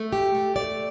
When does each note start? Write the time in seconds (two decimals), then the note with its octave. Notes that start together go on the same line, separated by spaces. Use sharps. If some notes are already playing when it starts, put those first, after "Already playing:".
Already playing: A3
0.13 G4
0.35 A3
0.56 D5